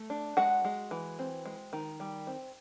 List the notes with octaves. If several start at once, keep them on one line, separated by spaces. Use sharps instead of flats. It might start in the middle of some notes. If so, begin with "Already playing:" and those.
Already playing: A3
D4
G#3 F#4 F#5
G#3
E3
C4
G#3
D#3
G3
C4